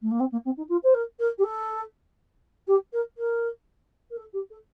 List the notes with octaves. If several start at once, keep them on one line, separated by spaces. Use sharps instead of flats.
A3
A#3
C4
A#3
C4
D#4
F4
C5
A#4
A#4
G4
A4
G4
A#4
A#4
A#4
A4
G4
A4